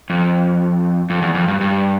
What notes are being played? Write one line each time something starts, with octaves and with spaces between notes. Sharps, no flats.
F2
F2
E2
F2
G2
G2